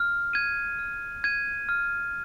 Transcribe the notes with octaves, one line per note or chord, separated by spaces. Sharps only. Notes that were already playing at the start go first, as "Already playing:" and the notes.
Already playing: F6
G#6 D#7
F6
G#6 D#7
F6